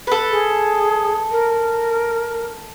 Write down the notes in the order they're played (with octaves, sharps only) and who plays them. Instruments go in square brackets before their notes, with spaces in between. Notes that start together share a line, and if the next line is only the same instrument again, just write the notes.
[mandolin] A4 B4
[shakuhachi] G#4
A#4